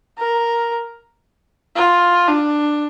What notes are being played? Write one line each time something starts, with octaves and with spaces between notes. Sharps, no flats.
A#4
F4
D4